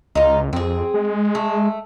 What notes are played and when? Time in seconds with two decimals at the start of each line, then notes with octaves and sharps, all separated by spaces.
0.15 C#2 D#4 F4
0.53 F2 C4 G#4
0.94 G#3
1.35 A3